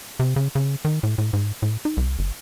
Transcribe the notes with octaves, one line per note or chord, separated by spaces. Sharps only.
C3
C#3
C#3
D#3
A2
A2
G#2
A2
D#4
C2
G1